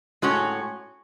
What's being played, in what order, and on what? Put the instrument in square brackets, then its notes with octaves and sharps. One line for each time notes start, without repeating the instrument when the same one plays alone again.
[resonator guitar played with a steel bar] A2 G#3 C#4 F#4 C#5